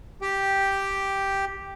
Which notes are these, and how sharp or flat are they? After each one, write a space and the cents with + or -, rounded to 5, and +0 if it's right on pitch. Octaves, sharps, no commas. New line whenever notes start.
G4 +0 G5 +0